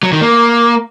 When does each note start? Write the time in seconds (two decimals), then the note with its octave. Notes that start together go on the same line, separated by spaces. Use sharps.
0.03 F#3
0.12 D#3
0.21 A#3